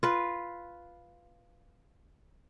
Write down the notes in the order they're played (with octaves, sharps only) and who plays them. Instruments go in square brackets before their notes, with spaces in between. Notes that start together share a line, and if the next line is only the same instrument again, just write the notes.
[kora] F4 B4